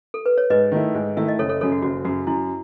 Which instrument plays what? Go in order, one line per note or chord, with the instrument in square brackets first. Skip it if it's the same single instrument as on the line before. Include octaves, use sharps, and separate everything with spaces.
[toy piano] A4
B4
C#5
[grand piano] G#2 [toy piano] B4 D#5
[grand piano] D#3 A3 E4
G#2
[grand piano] D#3 A3 E4 [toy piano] E5
[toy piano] D#5
[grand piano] F#1 [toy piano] A4 C#5
[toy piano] A4 C#5
[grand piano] F#2 C#3 [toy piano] A4 C#5
[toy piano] F#4
[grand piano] F#1 [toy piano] F#4
[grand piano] F#2 C#3 [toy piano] F#4
[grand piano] F#2 [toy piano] E4